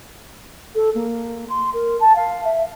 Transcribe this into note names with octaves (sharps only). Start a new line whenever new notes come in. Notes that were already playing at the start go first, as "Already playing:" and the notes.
A4
A#3
C6
A#4
A5
F5
E5